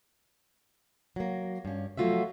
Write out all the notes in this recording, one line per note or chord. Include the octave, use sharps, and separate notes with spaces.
F#3 A#3
G2 C#4
F3 F#3 A3 F4 F#4 E5